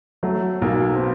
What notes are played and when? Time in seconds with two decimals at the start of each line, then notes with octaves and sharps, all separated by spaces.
0.23 F#3 A3
0.62 B1 A#3
0.95 C4
0.99 B3